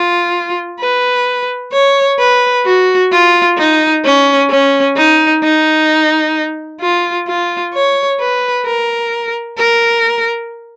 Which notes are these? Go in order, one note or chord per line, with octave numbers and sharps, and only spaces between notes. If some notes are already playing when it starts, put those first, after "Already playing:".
Already playing: F4
B4
C#5
B4
F#4
F4
D#4
C#4
C#4
D#4
D#4
F4
F4
C#5
B4
A#4
A#4